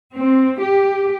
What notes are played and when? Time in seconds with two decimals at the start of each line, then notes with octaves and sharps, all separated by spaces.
0.14 C4
0.61 G4